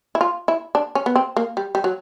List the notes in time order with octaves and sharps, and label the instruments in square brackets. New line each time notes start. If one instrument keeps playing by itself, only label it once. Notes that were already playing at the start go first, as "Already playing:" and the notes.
[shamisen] E4
F4
E4
D4
C#4
B3
C4
A#3
G3
G3
F#3